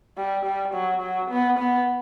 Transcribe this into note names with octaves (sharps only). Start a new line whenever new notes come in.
G3
G3
F#3
F#3
B3
B3